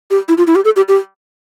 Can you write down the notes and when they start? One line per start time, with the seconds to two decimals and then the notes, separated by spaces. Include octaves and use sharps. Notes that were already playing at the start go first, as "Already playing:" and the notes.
0.10 G4
0.28 E4
0.38 F4
0.47 E4
0.55 G4
0.65 A4
0.76 G4
0.88 G4